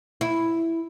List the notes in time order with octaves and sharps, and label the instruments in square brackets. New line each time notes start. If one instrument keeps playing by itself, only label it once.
[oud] E4